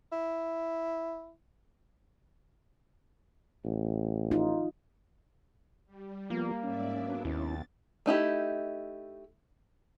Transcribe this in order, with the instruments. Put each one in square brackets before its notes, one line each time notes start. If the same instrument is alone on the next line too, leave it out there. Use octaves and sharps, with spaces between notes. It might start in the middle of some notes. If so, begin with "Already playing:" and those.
[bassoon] E4
[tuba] A1
[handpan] D#4 F4
[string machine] G3
[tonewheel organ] F3 B3 F4 [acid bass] A#3
[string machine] G#2 D5 E5 [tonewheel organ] C#4
[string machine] F#3 B3 D4
[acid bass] D#2 [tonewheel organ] C#4 E4 [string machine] A6
[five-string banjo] A3 D#4 E4 G4